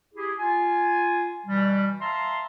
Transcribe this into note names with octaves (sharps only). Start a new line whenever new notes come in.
E4 G4 G#4
F4 G#5
B2 E3 G3
E5 F5 A5 A#5 C6